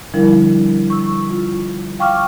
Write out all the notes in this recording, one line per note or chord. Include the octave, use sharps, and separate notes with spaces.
D3 F3 G3 D4 E4 A#4
C#6 E6
F4
F5 G5 C#6 D6 F6